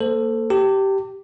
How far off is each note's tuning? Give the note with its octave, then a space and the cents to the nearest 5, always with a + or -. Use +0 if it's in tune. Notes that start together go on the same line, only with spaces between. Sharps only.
A#3 -15 A4 +10 C5 -15
G4 -10 A5 +45